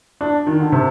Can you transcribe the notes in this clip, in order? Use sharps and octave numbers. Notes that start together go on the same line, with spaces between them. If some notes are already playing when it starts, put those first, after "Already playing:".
D4
D#3
D3
C3